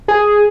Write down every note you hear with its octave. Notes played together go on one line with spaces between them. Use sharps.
G#4